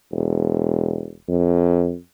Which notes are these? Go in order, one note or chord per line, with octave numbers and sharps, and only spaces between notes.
E1
F2